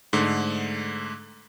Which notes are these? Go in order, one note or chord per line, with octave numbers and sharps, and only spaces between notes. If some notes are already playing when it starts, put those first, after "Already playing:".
G#2 D3 A3